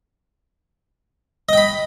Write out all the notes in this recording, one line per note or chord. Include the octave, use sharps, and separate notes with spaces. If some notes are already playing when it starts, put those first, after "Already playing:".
D#5 G5 B5